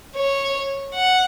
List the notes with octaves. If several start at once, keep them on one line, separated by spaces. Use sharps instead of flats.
C#5
F#5